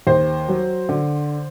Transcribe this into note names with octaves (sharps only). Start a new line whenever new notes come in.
D#2 C5
F#3
D3